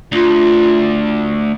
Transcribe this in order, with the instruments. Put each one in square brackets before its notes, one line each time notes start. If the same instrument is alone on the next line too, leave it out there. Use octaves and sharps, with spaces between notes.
[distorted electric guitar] D2 [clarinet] F4